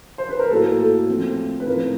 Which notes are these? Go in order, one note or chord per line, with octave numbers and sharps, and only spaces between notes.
C5
B4
A#4
A2 F#3 A#3 A4
A4
F3 A3 C4
B4
A2 F3 A3 C4 A#4